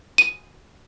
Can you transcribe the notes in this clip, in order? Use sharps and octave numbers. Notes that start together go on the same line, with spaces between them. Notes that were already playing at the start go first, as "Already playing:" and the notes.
D#7